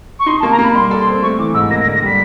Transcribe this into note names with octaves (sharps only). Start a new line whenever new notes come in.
C#6
D#4 C6
A5
A#3
A#5
A#3 B5
G3 C6
A4
C6
C4
A3 C#6
E3 D6
G#2 E6
A#3 A#6
A#6
D3
A#6
G3 B6